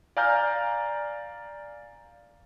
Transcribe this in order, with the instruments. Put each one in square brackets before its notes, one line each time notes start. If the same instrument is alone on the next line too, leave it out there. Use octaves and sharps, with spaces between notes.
[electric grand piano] D5 F5 G#5 A#5 F6 G6